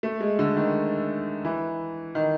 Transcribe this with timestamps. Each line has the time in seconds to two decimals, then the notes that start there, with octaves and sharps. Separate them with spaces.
0.03 A3
0.21 G#3
0.39 D3
0.57 D#3
1.45 E3
2.15 D#3